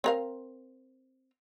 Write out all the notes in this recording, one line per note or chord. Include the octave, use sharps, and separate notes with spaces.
C4 A#4 F5